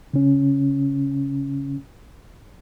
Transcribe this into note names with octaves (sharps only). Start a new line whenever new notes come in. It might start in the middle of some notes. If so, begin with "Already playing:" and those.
C#3 C#4